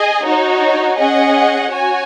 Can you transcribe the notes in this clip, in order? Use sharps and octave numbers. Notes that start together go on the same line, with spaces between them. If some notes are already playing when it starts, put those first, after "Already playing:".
Already playing: G#4 D#5 G#5
D#4 F#4 C#5
C#4 G#4 D#5 F#5
F#4 C#5 G#5